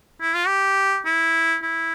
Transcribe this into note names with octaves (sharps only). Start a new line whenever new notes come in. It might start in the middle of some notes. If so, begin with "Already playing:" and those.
E4
F4
G4
E4
E4